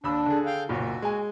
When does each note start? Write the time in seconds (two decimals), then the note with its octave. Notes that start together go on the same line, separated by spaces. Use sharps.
0.04 D#2 D4 B5 E6
0.26 D3 G#4
0.46 F5 G5
0.69 F#1 B1 A#2 F#4
1.02 G#3 G#5